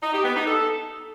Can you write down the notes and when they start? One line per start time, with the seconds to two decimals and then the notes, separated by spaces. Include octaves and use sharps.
0.02 D#4
0.13 G4
0.24 B3
0.35 D#4
0.46 A4